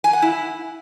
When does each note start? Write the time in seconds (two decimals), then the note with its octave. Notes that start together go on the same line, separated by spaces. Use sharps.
0.04 G#5
0.13 F#5
0.22 E4